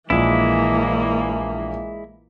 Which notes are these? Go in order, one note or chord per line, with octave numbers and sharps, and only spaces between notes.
A#1 E3 G#3 A#3 E4